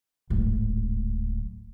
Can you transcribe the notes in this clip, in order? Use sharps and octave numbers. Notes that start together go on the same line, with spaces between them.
D1 G#1